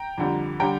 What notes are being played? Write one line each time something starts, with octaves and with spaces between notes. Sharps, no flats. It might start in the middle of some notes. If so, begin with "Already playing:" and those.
Already playing: G5 A#5
F2 D3 G3
D3 G3 G5 A#5